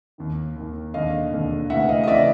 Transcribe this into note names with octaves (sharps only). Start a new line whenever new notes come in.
D#2 D#3
D#2 D#3
E1 D#2 D3 D#5 F5
E1 D#2 D3
D2 C#3 E3 E5 F#5
D#5 F5
D#5
C#3 E3 D5 E5